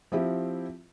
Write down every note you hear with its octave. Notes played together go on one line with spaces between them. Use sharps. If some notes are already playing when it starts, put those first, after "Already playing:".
F3 C4 E4 G4